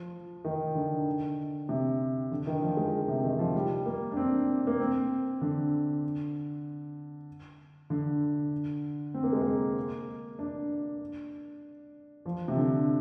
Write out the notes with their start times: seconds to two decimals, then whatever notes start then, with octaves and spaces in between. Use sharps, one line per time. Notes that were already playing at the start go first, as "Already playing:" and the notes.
Already playing: F3
0.45 D#3
0.75 D3
1.69 C3
2.31 D3
2.47 D#3
2.62 F3
2.77 G#3
3.08 C3
3.24 D#3
3.39 F3
3.56 G3
3.86 A#3
4.12 D4
4.17 C4
4.67 A#3
4.80 C4
5.42 D3
7.90 D3
9.14 C4
9.23 A#3
9.33 G#3
9.42 A#3
10.39 D4
12.26 F3
12.48 C3
12.57 D3